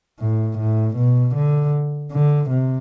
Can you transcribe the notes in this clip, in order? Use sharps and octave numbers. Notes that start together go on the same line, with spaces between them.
A2
A2
B2
D3
D3
C3